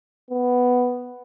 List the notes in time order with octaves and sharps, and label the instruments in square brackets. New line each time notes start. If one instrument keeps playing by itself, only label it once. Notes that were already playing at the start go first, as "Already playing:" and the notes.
[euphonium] B3